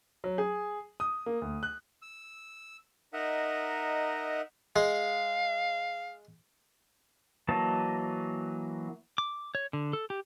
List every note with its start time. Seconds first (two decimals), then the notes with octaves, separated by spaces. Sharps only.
0.24 F#3
0.38 G#4
1.00 D#6
1.26 A#3
1.42 D2
1.63 F#6
2.02 E6
3.13 D#4 A#4 D#5 E5 F#5
4.76 G#3 F5
7.48 E3 F#3 A#3 D#5 A5
9.18 D6
9.55 C#5
9.73 D3
9.93 A4
10.10 G4